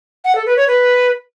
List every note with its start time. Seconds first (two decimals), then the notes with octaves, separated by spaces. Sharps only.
0.24 F#5
0.35 A4
0.46 B4
0.57 C#5
0.67 B4